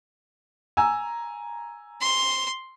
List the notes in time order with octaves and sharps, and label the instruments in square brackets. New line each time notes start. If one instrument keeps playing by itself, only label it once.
[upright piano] G#5 A#5 E6
[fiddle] C6